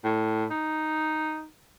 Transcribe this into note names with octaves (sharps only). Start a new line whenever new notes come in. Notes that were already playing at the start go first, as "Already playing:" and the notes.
A2
D#4